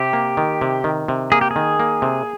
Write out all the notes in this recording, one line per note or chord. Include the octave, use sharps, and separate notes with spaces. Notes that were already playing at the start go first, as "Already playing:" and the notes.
Already playing: C3 G4
A#3
D#3
C3
D#3
C3
A#3 G#4
G4
G#4
D#3
A#3
C3